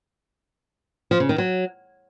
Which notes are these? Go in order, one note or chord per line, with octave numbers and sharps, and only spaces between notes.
F3
C#3
D#3
F#3